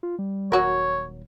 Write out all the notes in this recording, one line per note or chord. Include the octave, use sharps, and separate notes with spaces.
F4
G3
D#1 F#3 F#4 A#4 C#5